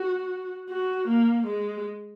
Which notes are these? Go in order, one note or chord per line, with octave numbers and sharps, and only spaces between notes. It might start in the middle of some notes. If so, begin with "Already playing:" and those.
Already playing: F#4
F#4
A#3
G#3